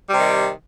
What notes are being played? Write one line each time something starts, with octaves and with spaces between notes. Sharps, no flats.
C3 D#3 G3